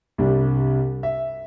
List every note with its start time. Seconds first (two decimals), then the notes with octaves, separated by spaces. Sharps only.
0.18 C2 C3 G3 D4
1.03 E5